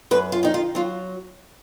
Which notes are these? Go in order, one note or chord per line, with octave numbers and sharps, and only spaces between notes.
F#2 B4
F4
D#3 D#4
F4
F#3 F4